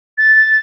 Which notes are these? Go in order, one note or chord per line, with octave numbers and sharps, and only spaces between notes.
A6